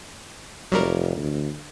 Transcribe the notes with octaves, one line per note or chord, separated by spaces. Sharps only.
F1 F#3 G3 A#4
D2